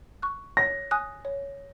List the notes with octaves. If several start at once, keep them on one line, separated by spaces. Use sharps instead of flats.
C#6 F#6
C#5 A#6
G#5 D#6 F#6
C#5